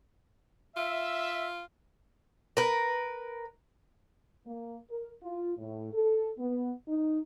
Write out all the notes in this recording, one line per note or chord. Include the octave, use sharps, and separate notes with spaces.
F4 E5
A#4 B4
A#3
A#4
F4
A2
A4
B3
D#4